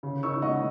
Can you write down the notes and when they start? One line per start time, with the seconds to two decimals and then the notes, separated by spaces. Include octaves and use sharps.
0.03 C#3
0.23 D#4 C#6 E6
0.42 G#3 D#5 F#5